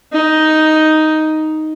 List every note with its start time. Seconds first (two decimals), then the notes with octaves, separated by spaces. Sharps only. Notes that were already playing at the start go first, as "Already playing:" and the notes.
0.13 D#4